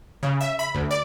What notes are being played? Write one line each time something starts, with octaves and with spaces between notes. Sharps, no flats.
C#3
E5
B5
D2
D5